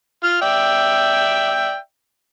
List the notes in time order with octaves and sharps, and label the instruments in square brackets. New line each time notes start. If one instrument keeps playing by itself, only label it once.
[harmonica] F4 F6
D5 E5 G5